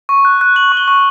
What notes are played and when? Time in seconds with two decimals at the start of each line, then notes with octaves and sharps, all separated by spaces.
0.09 C#6
0.25 F#6
0.41 F#6
0.56 F#6 F#7
0.72 C#6
0.77 G7
0.88 C#6